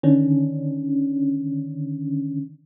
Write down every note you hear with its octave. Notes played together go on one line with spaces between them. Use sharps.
D3 D#3 C#4 D4